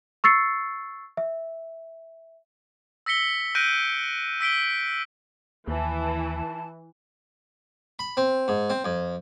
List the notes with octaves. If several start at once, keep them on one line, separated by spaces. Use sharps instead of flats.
C#6 E6 A6 C7 C#7
E5
E6 A#6 B6 C#7 G7
F#6 G6 A#6 D7 D#7
E6 B6 D7 G7
D#2 E3 A5
B5
C4
G#2
C4
F2